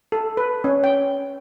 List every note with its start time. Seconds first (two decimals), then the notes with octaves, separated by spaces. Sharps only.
0.12 A4
0.37 B4
0.64 C#4
0.84 G5